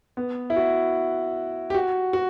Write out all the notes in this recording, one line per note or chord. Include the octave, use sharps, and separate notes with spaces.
B3
E4
F#4
G4
F#4
F#4